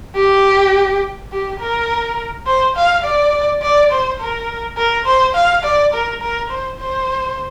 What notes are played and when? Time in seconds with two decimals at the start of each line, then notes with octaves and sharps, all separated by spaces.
0.16 G4
1.32 G4
1.60 A#4
2.46 C5
2.76 F5
3.04 D5
3.62 D5
3.91 C5
4.20 A#4
4.77 A#4
5.05 C5
5.34 F5
5.63 D5
5.93 A#4
6.21 A#4
6.50 C5
6.79 C5